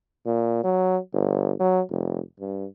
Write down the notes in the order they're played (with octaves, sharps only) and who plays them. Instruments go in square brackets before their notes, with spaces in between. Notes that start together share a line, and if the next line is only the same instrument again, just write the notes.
[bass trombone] A#2
F#3
G1
F#3
F1
G2